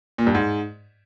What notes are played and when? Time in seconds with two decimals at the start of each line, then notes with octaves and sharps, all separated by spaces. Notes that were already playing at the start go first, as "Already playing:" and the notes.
0.18 A#2
0.27 G2
0.35 G#2